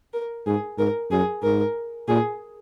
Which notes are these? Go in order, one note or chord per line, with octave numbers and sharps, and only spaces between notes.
A#4
G#2 G#4
G#2 A#4
F#2 G#4
G#2 A#4
A#2 G#4